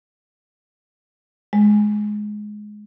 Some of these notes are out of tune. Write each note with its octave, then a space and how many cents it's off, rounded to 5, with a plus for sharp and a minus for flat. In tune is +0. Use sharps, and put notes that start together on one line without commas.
G#3 +15